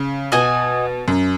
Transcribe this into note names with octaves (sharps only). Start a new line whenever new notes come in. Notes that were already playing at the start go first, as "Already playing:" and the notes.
Already playing: C#3
B2 F#4 D#5 G#5
F#2